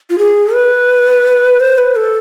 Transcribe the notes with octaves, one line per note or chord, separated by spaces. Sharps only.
F4
G#4
B4
C5
B4
A4